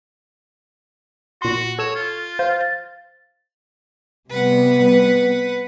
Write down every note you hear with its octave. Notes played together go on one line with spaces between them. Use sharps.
A#2 F#4 C6
A4 C#5 E7
F4
C5 F5
A6
C3 G3 B3 B4 F#5